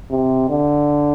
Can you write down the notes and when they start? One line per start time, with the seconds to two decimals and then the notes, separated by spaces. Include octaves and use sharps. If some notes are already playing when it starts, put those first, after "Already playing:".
0.11 C3
0.50 D3